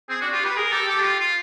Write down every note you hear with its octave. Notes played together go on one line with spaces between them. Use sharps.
C4 G#4
D4 F#4
F4 G4
G4 B4
G#4 A#4
G4 A4
G4 A4
F4
F4